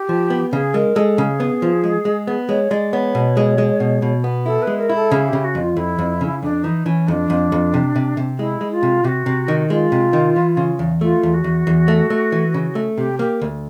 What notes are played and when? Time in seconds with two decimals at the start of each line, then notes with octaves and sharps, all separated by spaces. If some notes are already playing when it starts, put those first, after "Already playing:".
Already playing: G4
0.09 F3
0.30 B3
0.52 C#3 G#4
0.74 G#3 A#4
0.96 G#3 A4
1.18 C#3 G#4
1.40 B3
1.62 F3
1.83 G#3
2.05 G#3
2.27 B3
2.49 G#3 C#5
2.71 G#3 D5
2.93 B3 C#5
3.15 B2
3.37 G#3
3.58 G#3
3.80 B2
4.02 B2
4.24 B3
4.46 E4 A4
4.62 B4
4.67 G#3
4.78 A#4
4.89 E4
4.95 A4
5.11 C#3 G#4
5.28 C#3 G4
5.44 F#4
5.55 F2
5.61 F4
5.77 F2 E4
5.99 F2
6.21 C#3
6.42 F2 D4
6.64 E3 D#4
6.86 E3 C#4
7.08 F2 D4 D#4
7.30 F2
7.52 F2
7.74 C3
7.96 C3
8.17 C3
8.39 G#3 E4
8.61 G#3
8.72 F4
8.83 C3
9.04 C3 F#4 G4
9.26 C3
9.48 D#3
9.70 G#3 F4
9.92 C3
10.13 D#3
10.36 E3
10.57 C#3
10.79 E2
11.01 A3 F4
11.23 E2
11.34 F#4
11.44 E2
11.67 E2
11.88 A3
12.10 A3
12.32 E3
12.54 C#3
12.75 A3
12.97 C3 G4
13.19 A#3 G4
13.41 D2